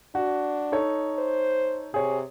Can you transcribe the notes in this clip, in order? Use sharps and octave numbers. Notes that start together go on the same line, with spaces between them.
D4 F#4
D#4 A4 C#5
C5
C3 G#4 C#5